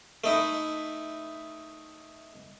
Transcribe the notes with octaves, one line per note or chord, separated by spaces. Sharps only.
A3 D#4 E4